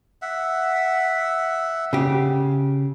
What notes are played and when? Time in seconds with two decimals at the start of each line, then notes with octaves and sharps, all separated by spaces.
0.22 E5 F#5
1.93 C#3 G4